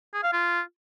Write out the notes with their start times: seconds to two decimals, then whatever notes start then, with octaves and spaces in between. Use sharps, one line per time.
0.14 G#4
0.23 F5
0.33 F4